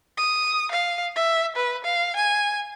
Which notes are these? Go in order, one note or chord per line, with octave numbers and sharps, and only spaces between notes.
D#6
F5
E5
B4
F5
G#5